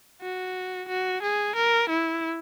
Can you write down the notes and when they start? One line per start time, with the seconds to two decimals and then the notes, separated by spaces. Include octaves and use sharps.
0.22 F#4
0.89 F#4
1.22 G#4
1.56 A#4
1.89 E4